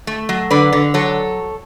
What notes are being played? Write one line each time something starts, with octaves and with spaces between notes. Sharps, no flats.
A3
F#3
D3 B4 D5
D3
F#3 A4 C#5